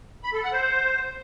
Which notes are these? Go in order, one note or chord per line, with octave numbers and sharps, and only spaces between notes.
B5
A4
F#5
C5